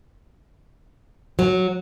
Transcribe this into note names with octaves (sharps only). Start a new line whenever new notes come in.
F#3